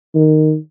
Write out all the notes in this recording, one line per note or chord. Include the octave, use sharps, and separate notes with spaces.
D#3